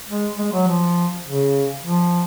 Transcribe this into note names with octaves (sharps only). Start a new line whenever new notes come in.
G#3
G#3
F#3
F3
C#3
F3